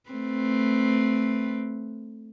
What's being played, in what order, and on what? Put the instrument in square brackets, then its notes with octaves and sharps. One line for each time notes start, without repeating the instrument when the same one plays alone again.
[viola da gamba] A3 C4 B4